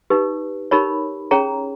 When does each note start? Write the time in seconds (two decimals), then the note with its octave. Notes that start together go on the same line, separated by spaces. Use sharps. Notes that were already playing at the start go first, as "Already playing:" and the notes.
0.10 D#4 G4 B4
0.71 D#4 G4 A#4 C#5 B5
1.31 C#4 G#4 C#5 A#5